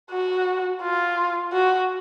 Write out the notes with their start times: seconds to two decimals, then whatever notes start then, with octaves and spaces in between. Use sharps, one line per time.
0.11 F#4
0.82 F4
1.53 F#4